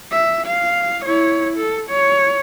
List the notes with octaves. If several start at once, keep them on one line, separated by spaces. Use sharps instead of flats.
E5
F5
E4 C#5
A4
C#5